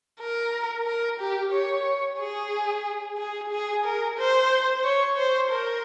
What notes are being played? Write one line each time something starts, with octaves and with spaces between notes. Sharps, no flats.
A#4
A#4
G4
C#5
G#4
G#4
G#4
A#4
C5
C#5
C5
A#4